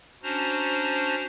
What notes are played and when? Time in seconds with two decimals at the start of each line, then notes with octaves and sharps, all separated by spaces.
0.23 C#4 D4 F#4 C5 A#5